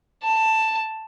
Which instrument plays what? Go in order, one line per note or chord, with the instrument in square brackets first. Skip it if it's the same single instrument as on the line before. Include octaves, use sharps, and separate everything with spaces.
[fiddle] A5